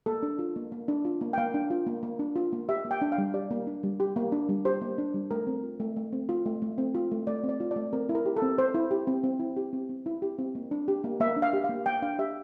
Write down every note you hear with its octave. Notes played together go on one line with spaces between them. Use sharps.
A#3 A4
D4
F4
A#3
A#3
D4
F4
A#3
G5
A#3 F5
D4
F4
A#3
A#3
D4
F4
A#3
G4 E5
A#3
G5
D4
F5
G3
G4 D5
A#3
D4
G3
G4
A#3
D4
G3
G4 C5
A#3
D4
G3
A3 A#4
C4
F4
A3
A3
C4
F4
A3
A3
C4
F4
A3
A3 D5
C4
D5
F4
A3 D5
C4 A#4
E4
A#4
G4
A4
C4
C4 C5
E4
G4
C4
C4
E4
G4
C4
C4
E4
G4
C4
A#3
D4
G4
A#3
A#3 E5
D4
F5
G4
F5
A#3
A#3 G5
D4 F5
G4 E5